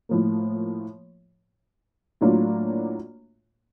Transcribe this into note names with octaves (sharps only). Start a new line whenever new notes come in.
A2 F3 A#3
A2 F#3 A#3 D4 F4